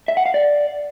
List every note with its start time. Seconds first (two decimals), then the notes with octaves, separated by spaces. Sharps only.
0.08 E5
0.17 F#5
0.26 F5
0.34 D5